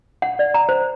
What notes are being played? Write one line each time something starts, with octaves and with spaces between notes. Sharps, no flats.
F#5
D5
A#5
C5